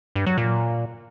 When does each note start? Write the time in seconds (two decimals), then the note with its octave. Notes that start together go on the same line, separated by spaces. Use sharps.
0.16 G2
0.26 F#3
0.37 A#2